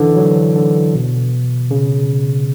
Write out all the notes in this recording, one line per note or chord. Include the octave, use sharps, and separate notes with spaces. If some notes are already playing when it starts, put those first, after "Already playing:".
Already playing: D3 E3
F#3
D3
B2
C#3